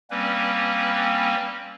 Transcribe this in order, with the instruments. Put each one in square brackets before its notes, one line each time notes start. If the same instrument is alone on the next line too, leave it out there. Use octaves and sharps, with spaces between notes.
[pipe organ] G3 A#3 C4 C#4 B4